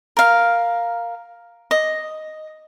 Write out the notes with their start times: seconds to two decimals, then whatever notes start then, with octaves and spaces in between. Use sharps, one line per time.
0.17 A#4 F5
1.71 D#5